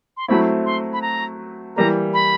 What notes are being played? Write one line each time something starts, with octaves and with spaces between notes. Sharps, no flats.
C6
F#3 A3 C4 E4 B5
C6
B5
A#5
E3 G3 A#3 A#5
B5